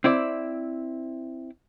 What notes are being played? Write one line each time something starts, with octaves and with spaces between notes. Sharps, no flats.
C4 E4 D5